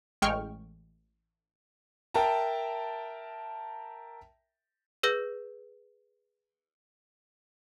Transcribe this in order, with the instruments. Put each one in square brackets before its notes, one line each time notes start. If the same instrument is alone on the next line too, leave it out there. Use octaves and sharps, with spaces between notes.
[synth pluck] A1 G#3 G5 C#6 F6
[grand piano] A#4 E5 G5 A5 A#5
[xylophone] G#4 B4 E6 G6 A#6 G7